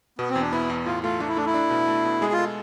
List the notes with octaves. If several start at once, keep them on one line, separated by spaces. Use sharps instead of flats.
B2 B3
C4
E2
D4
B3 E4
E2
A2 F4
A3 F4
A3 D4
E4
A3 D4
E4
D4
B2
A3
B2
G#3 G#4
F4
A4